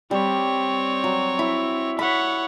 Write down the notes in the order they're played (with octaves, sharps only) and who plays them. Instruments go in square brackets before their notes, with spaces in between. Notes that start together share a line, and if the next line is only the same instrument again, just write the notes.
[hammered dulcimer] G3 [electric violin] C4 C#5
[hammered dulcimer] F#3
E4
[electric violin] C#5 F#5 [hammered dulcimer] B5